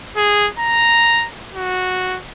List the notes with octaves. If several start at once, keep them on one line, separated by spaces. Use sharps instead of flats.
G#4
A#5
F#4